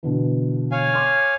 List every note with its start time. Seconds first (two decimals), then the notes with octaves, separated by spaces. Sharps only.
0.03 B2 D3 E3
0.72 C#5 F5 G#5
0.93 C6 D6 F6